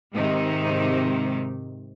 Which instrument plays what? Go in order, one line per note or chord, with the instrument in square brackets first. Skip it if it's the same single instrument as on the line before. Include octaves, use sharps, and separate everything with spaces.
[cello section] G#2 C3 D#3 D#4